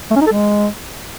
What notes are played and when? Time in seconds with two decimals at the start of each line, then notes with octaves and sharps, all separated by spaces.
0.11 A3
0.16 C#4
0.21 D#4
0.26 A4
0.32 G#3